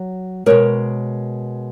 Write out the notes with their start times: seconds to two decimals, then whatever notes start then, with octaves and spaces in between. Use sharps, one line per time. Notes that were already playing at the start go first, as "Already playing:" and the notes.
Already playing: F#3
0.46 B2 G#3 A#4 C#5